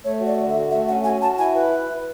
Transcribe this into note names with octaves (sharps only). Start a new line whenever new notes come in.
A3 C#5
F#4
D5
D3
E5
F#4
A3 E5
C#4 F#5
F#4 G#5
F#4 A5
E4 G#5
B4